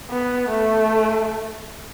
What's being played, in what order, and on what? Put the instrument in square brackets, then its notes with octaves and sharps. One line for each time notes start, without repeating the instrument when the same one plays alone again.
[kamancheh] B3
A3